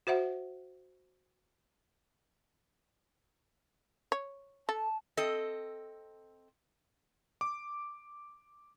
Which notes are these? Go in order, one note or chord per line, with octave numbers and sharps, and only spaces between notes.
F#4 C5 E5 F#5
C#5
A4 A5
C4 A4 D#5
D6